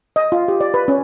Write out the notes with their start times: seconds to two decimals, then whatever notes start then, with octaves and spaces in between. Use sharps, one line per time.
0.16 D#5
0.32 F4
0.48 G4
0.61 D5
0.74 B4
0.88 C#4